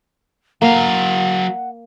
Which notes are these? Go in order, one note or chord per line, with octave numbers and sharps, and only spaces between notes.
F#3 A#3 F5 F#5